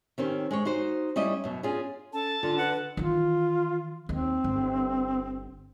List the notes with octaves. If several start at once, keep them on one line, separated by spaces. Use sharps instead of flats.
D#3 C4 C#4 G4
G#3 C5 C#5
D#4 F#4 C5
G3 C#4 E4 D#5
F#2 B2
C#4 D4 F4 G#4
C#4 A4 A5
D3 F4
B4 F#5
D#3 E3 F4
D#2 C4
G1